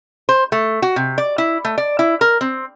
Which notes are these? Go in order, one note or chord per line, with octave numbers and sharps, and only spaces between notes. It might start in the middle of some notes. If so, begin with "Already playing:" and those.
C5
A3
F#4
C3
D5
E4
A3
D5
E4
A#4
C4